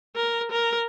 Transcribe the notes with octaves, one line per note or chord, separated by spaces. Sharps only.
A#4
A#4